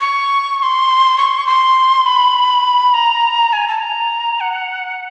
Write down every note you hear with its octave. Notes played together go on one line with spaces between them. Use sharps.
C#6
C#6
C6
C#6
C6
C#6
C6
B5
A#5
G#5
A5
A#5
F#5